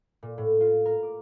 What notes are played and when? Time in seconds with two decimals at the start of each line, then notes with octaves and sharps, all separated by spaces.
0.23 A#2
0.38 A2
0.61 F4
0.85 A#4
1.03 D6